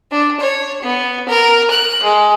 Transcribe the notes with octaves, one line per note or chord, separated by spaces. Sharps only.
D4
C#5
B3
A#4
F#6
G#3